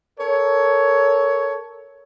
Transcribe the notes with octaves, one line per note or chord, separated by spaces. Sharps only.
A4 A#4 C#5